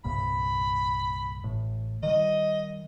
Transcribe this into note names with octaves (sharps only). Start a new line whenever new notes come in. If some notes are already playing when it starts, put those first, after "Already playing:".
C2 G2 A#2 B5
A1 A2
D#3 G3 D#5